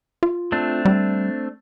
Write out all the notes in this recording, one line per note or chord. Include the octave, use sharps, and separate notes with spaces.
F4
A3 C4 D4
G3